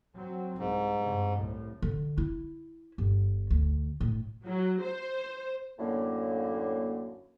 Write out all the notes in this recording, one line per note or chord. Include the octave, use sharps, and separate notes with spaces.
F#3 C4
C2 G#2
G2 C3
C2 A2
D3
E4
G1
D2
A2
F#3
C5
F#2 A2 D3 A#3